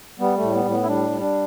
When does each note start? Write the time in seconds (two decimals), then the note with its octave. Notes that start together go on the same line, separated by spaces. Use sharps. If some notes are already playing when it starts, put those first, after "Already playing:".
0.20 G3 B3
0.37 A3
0.42 A2
0.54 B3
0.65 A2
0.71 B3
0.83 E4
0.88 G3 D4
1.10 G3
1.21 D4